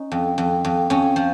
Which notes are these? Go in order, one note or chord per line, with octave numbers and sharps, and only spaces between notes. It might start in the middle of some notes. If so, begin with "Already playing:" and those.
Already playing: C#4 D#4
F2
F2
F2
F2 C#4
F3